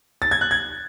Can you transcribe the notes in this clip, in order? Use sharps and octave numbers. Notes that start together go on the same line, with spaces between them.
A6
G#6
F#6
G#6